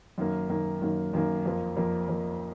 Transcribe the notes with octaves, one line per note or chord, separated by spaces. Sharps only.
F#2 D#3 A#3
F#2 D#3 A#3
F#2 D#3 A#3
F#2 D#3 A#3
F2 F3 A#3
F2 F3 A#3
F2 F3 A#3